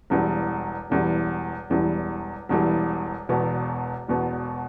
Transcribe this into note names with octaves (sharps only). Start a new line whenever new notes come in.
E1 E2 E3 G3
E1 E2 E3 G3
E1 E2 E3 G3
E1 E2 E3 G3
E1 E2 B2 B3
E1 E2 B2 B3